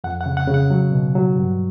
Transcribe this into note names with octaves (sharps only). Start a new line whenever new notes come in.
F2 F#5
F#5
C#3
F#5
C#3
F#5
F#3
B2
F#3
G2